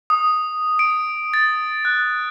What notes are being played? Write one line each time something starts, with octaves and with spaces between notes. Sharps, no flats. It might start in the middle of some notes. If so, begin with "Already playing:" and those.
D#6
D7
A6
F#6